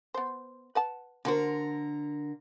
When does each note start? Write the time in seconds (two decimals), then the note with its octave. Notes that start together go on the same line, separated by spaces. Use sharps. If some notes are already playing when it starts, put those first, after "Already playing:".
0.14 B3 C5
0.75 B4 F#5 A5
1.25 D3 A#3 F#4 A#4 C5